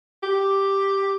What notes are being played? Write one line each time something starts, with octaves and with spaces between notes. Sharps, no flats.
G4